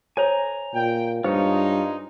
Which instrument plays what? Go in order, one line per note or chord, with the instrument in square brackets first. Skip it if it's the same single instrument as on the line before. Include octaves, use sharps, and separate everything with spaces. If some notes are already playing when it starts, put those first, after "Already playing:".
[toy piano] A4 C5 C#5 [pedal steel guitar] G#5 A#5
[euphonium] A#2 [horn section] G5
[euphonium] G2 [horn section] G#3 D#4 [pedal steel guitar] F4 C#5 [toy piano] C5